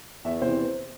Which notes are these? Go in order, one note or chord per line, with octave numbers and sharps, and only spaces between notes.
E2 E5
C3 E3 C5